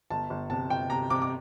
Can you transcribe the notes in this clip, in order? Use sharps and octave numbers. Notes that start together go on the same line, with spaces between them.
G1 A5
G1
C3 A5
G1 G5
C3 A#5
C3 D6
D6